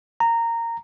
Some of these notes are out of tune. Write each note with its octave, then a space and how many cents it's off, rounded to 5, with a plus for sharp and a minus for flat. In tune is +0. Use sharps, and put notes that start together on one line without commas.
A#5 -15